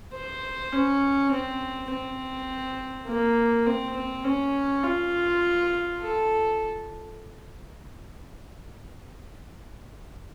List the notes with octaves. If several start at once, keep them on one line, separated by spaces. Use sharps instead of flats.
C5
C#4
C4
C4
A#3
C4
C4
C#4
F4
A4